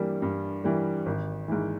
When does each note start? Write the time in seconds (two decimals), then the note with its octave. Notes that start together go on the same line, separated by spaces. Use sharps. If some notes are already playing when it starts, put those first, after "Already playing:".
Already playing: G2 E3 G3 A#3
0.22 G2
0.64 E3 G3 A#3
1.06 G#1
1.48 G#2 E3